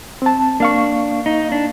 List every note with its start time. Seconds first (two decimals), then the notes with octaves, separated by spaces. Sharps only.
0.22 C4 A5
0.60 A#3 D4 F5 C#6
1.26 D#4
1.52 D4